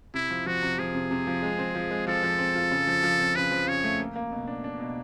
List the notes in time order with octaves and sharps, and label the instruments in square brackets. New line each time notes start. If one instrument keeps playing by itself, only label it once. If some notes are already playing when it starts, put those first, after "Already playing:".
[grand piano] C3 [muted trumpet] E4
[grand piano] F3
[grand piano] F3 [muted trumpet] F#4
[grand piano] C3
[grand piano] F3 [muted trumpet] G#4
[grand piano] C3
C3
F3
G#3
C4
F3
G#3
[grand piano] F3 [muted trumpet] A4
[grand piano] F3
C4
F4
C#3
F3
F3
C4
[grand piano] C#3 [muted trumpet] B4
[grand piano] F3
[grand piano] C#3 [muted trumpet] C#5
[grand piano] A3
A#3
A#3
B2
D4
D4
B2